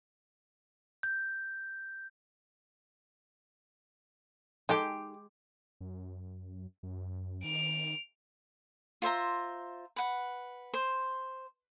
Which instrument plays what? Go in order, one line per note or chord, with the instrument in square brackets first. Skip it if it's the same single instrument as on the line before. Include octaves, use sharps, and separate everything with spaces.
[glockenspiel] G6
[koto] G#3 G4 [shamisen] D#4 A4 G5
[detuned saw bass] F#2
F#2
[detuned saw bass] D#3 [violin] D7 F7
[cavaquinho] F4 C5 E5 A#5
B4 F#5
C5